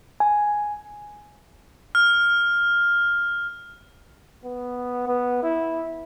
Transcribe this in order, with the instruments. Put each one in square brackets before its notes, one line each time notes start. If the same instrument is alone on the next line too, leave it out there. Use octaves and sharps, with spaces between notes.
[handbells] G#5
[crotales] F6
[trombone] B3
B3
E4